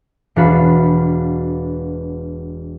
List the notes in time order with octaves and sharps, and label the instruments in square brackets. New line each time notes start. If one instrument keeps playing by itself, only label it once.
[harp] E1 D4 F#4 F5 B5